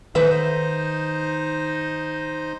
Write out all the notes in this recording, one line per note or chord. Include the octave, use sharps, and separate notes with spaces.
D#3 D#4 B4 C5 D#5 E5